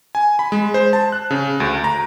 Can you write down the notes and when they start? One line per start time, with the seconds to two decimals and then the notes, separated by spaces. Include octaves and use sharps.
0.15 G#5
0.39 B5
0.52 G#3
0.74 C5
0.93 A5
1.12 F#6
1.31 C#3
1.60 D2
1.84 A#5